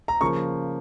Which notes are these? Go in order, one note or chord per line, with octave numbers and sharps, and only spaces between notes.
A#5
C#3 F3 A#3 C#6